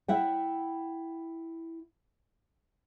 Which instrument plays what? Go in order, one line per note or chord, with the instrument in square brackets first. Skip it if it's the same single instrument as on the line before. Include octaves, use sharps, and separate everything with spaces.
[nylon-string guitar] E4 E5 F#5 G5